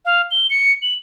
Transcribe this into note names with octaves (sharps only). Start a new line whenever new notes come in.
F5
G7
C#7
F#7